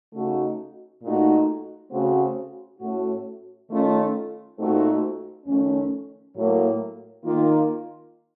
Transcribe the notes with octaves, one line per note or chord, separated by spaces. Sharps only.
C#3 A3 D#4 F#4
A#2 A3 D#4 F#4
C#3 A3 C4 F#4
A2 A3 C#4 F#4
D#3 A3 C#4 F4
A#2 A3 C4 D#4 F#4
F2 D#3 A3 C#4
A2 F#3 A#3
D#3 A#3 F4